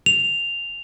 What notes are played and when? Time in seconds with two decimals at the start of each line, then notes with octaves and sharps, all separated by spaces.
0.06 F7